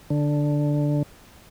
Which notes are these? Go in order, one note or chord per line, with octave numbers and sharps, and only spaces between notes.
D3